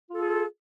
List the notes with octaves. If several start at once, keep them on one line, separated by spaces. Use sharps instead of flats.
F4 G#4 A4